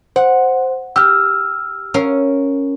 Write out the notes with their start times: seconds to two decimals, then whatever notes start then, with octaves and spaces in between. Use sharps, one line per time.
0.16 C5 F#5
0.96 G4 E6 F6
1.94 C#4 A#4 F5